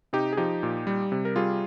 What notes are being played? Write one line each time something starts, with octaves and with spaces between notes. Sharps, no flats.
C3 D#4 G4
G#4
F3 D#4 G4
A#2
G3
C3
A#4
G3 F4 G#4